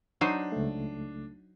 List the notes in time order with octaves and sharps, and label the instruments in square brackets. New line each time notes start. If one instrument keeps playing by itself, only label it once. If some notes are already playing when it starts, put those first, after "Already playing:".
[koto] F#3 D#4 C5 [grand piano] D4 C7 D#7
[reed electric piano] C#2 A3